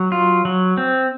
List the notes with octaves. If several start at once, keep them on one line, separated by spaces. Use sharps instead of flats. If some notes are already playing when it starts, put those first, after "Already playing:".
Already playing: F#3
F4
F#3
C4